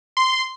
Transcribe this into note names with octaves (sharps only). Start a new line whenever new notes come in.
C6